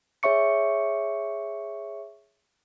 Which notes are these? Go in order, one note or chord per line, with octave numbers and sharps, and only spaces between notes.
G#4 C#5 E5 C#6 C#7